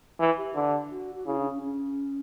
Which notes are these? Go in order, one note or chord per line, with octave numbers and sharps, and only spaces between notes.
E3
G4
D3
F#4
F#4
C#3 E4
D4
C#4
C#4